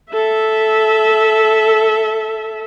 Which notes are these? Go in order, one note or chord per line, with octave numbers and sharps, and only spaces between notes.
A4 E5